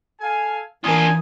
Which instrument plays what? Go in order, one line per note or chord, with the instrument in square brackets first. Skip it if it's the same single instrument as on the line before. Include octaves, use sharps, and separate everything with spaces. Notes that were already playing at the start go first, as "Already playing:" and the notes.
[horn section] A4 F5 G#5
[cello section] E3 [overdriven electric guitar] D4 F4 [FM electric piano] A#4 D#6 [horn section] G#5